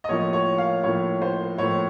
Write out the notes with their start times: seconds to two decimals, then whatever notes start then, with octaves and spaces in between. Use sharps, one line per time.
0.04 D#5
0.09 A2 F3 A#3 C#5
0.33 C#5
0.58 F5
0.83 A2 F3 A#3 C#5
1.22 C5
1.58 A2 F3 A#3 C#5